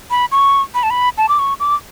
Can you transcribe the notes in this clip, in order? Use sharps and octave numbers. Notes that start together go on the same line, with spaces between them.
B5
C#6
B5
A5
B5
A5
D6
C#6
D6